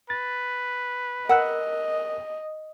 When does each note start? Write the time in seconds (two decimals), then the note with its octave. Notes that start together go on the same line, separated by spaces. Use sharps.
0.10 B4 A6
1.29 A#4 D#5 F#5 E6 F#6